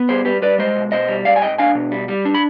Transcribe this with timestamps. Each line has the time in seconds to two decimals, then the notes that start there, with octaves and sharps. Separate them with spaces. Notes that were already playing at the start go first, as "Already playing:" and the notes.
Already playing: B3
0.09 G3 G#4 C5
0.25 G3 G4 B4
0.42 G3 B4 D5
0.58 G#3 C5 D#5
0.76 B1
0.92 B2 C5 D#5
1.08 G3
1.25 G#2 D5 F5
1.36 G#5
1.42 G#2 D#5 G5
1.58 D4 F5 G#5
1.75 B2
1.92 G3
2.08 G3
2.25 D4
2.35 B5